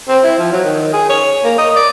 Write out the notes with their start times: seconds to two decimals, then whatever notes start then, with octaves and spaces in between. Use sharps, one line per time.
0.09 C4
0.24 E4
0.39 F3
0.52 F#3
0.64 D#3
0.93 G#4
1.10 C#5
1.44 A#3
1.58 D#5
1.76 D5